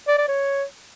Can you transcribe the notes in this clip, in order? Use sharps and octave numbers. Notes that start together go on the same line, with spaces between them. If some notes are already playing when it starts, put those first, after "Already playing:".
D5
D5
C#5